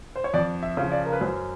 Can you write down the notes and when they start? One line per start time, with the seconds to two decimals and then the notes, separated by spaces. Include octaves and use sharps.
0.16 C5
0.24 C#5
0.34 F2 D5
0.63 E5
0.77 C#3 F3
0.92 D5
1.05 A#4
1.13 B4
1.21 F#2 C5